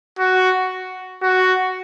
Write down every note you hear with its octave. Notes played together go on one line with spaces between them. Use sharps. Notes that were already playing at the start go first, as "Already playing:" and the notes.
F#4
F#4